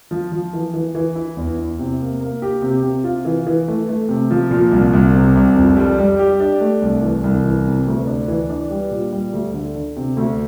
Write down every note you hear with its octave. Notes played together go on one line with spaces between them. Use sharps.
F3
F3
E3
E3
E3
E4
E2
E4
C3
A#3
A#3
G4
C3
C3
F4
E3
E3
A3
A3
C3
F3
A#2
C2
C2
C3
C2
F2
G3
G3
G4
D4
A3
C2
E3
C2
E3
C3
D2
D4
E3
D4
G3
A#2
G3
D2
D3
D3
C3
D2